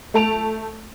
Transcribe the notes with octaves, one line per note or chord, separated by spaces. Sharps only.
A3 A4 A5 D7 F7